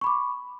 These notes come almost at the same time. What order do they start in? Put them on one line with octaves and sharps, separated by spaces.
C#6 B5 D6